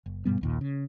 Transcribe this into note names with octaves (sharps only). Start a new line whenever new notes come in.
F#1
G2 B2 G3 B3
A#1 D#2 A#2
C#3